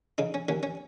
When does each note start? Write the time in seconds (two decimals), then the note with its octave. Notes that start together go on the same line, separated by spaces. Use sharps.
0.18 C#3 D#4
0.34 C#4
0.48 D#2 C#4
0.63 C#4